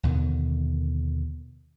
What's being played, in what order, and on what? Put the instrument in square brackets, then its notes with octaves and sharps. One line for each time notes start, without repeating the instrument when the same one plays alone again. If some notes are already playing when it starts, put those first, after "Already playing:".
[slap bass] D#2 B2 D3 D#3